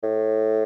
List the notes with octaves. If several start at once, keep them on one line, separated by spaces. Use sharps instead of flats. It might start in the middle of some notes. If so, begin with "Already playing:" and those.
A2